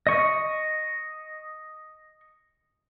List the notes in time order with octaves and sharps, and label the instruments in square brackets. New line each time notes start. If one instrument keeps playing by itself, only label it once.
[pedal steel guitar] D#5 C#6